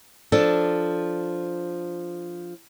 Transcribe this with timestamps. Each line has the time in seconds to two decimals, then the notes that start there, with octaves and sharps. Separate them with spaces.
0.32 F3 D4 A4